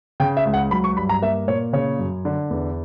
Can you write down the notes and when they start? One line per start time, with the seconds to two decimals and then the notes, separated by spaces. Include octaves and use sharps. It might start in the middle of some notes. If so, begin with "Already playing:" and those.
0.20 C#3 G5
0.37 E5
0.45 C#2
0.54 F#5
0.71 F#3 B5
0.84 C#6
0.97 G2 B5
1.09 A#5
1.22 A#3 E5
1.47 A#2 C#5
1.73 C#3 C#5
1.99 F#2
2.25 D3
2.51 E2